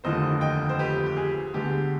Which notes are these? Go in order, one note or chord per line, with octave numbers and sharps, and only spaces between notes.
F1 D#2 D3 F3 C5 D#5
D#5 G5
C5
G4 B4
G4
G#4
D2 D3 G#3 B3 G4